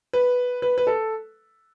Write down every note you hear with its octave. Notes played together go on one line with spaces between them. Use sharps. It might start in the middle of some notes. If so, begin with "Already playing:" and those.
B4
B4
B4
A4